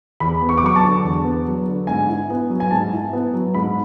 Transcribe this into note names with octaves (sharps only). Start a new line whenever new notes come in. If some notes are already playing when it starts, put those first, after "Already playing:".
E2 B5
B3
C#6
D6
F#3 C#6
A5
D3
E2
B3
F#3
D3
G#2 G#5
E4
B3
F#3
G#5
G#2 A5
E4
B3
F#3
G#2 B5